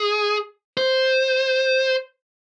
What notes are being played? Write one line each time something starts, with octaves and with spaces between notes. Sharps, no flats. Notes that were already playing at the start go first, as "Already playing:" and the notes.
Already playing: G#4
C5